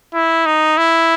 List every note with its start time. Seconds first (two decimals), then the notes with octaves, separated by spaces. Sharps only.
0.14 E4
0.46 D#4
0.77 E4